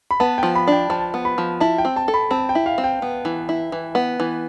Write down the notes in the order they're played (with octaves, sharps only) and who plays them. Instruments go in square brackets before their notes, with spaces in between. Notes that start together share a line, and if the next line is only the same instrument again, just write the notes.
[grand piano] B5
[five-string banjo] B3 [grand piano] A5
[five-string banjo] F3 [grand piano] G5
[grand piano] B5
[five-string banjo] D4 [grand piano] G5
[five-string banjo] F3 [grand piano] A5
[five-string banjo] B3
[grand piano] B5
[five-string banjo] F3
[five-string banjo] E4 [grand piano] A5
[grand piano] G5
[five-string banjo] C4
[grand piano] A5
[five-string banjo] A4
[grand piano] B5
[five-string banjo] C4 [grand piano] A5
[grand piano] G5
[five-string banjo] E4
[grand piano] F5
[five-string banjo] C4
[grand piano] G5
[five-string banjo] B3
E3
E4
E3
B3
E3